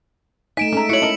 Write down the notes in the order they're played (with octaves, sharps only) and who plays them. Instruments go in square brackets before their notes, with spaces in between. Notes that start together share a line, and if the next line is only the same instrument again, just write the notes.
[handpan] A3 D#4 [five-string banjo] G#5 [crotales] B6 D7 E7
[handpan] G#3 A4 [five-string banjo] C#4 A#5
[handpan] E4 [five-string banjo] F#4 C#5 [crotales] C#7 F#7
[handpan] C#4 [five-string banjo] A#4 D#5 A5